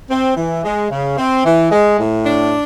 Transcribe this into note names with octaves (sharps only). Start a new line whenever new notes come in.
C4
E3
G#3
C#3
C4
E3
G#3
A2
D4